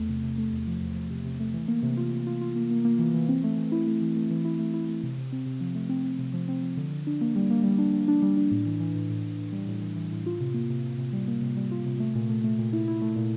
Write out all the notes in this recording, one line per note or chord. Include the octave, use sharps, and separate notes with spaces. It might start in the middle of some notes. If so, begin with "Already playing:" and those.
Already playing: E2 A3
C3
C3
A3
E2
F3
E2
F3
C3
C3
A3
E3
A#3
C3
F4
C3
F4
F4
A#3
A#3
A#3
E3
E3
C4
A3
E3
E4
A3
E3
A3
E3
E4
A3
E4
A3
C3
C3
C4
C3
F3
A3
C4
C4
C3
F3
C4
F3
D3
D3
D4
A#3
G3
A#3
G3
D4
G3
D4
G3
D4
A2
E3
E3
A2
A2
A2
A2
G3
A2
E3
E3
A2
F4
C3
A#3
C3
C3
C3
G3
A#3
C3
G3
F4
C3
A3
A#2
A3
A3
A#2
E4
E4
A3
A#2